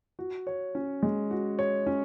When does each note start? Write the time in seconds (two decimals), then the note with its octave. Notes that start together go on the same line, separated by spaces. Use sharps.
0.19 F#4
0.47 C#5
0.75 C#4
1.03 G#3
1.31 F#4
1.59 C#5
1.87 C#4